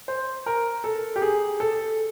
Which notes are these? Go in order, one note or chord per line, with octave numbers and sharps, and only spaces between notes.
C5
A#4
A4
G4
G#4
A4